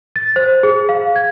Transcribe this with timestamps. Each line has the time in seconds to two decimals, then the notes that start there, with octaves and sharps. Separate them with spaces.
0.16 A6
0.36 C5
0.63 G#4
0.89 F5
1.16 G#6